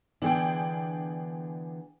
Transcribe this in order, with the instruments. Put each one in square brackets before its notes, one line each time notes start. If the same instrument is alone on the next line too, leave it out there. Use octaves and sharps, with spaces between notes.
[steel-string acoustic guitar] D3 E3 B3 [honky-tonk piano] D4 G#4 G5